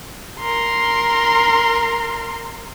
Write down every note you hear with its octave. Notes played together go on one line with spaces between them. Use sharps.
A#4 C6